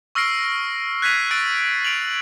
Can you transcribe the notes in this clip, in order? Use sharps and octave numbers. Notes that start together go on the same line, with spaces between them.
C#6 E6 F6 A#6 C7 D7
F#6 G#6 B6 C7 D#7 F7
E6 F#6 A6 D7
D7 F7 F#7